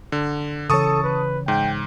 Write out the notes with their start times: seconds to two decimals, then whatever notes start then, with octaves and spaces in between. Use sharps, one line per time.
0.12 D3
0.70 C#3 E3 A4 C#5 A5 C#6 D#6
1.04 B4
1.48 G#2 G5